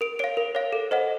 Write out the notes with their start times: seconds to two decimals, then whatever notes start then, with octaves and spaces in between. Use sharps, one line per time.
0.01 A#4 D7
0.19 C#5 F5 D7
0.37 A#4
0.55 C#5 F5
0.73 A4
0.91 C5 D#5 F#5